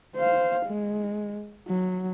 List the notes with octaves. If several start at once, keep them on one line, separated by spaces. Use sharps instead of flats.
C5 F5
G#3
F#3